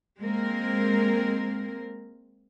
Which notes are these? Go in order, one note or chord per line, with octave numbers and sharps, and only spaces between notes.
G#3 A#3 C4 A#4